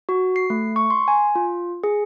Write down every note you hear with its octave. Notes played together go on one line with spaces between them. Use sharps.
F#4
C7
A3
C#6
C6
G#5
F4
G#4